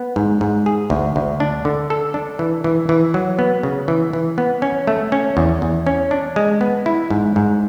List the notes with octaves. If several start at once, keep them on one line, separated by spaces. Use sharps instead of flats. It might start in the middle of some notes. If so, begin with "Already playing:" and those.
Already playing: B3
G#2
G#2
G#4
D2
D2
D4
D3
A4
D4
E3
E3
E3
F#3
B3
C#3
E3
E3
B3
C#4
A3
C#4
E2
E2
C#4
D4
G#3
B3
E4
G#2
G#2